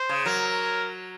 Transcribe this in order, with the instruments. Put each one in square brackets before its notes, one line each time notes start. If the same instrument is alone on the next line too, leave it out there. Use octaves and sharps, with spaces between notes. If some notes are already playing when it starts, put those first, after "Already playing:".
Already playing: [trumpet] C5
[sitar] C#3
[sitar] F#3 [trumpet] A#4